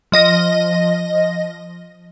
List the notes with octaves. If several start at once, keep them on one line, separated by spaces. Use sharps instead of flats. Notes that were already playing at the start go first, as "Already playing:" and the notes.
F3 D#5 A#6